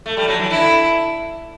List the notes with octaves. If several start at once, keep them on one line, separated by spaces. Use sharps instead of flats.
A3
G3
F#3
E3
D3 E4